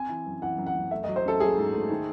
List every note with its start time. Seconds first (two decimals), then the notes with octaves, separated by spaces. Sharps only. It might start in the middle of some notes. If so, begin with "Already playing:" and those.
Already playing: C4 G#5
0.09 E3
0.26 F#2
0.42 E3 F#5
0.58 F#2
0.66 F#5
0.76 F#2
0.91 A3 E5
1.04 F#3 D#5
1.16 C5
1.25 C#4 A4
1.40 F#3 G#4
1.58 G#2
1.74 A3
1.90 D#3